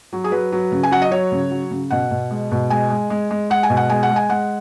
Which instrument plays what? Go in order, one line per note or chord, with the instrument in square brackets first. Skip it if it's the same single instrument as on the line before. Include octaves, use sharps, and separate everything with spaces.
[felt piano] F#3
G#4
F#3 B4
F#3
C#3
G#5
F#3 F#5
D#5
F#3 C#5
C#3
F#3
C#3
B2 F#5
B2
G#3
B2
G#3 G#5
G#3
G#3
G#3
G#3 F#5
G#5
B2
F#5
G#3 G#5
F#5
G#3
G#5
G#3 F#5